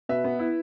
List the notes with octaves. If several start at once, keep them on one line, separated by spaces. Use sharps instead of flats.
B2 B4 E5
B3
E4